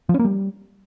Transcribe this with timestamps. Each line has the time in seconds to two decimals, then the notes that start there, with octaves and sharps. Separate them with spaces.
0.09 F3
0.14 C#4
0.19 A#3
0.25 G3